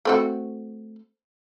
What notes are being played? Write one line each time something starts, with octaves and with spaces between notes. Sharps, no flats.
A3 C4 F#4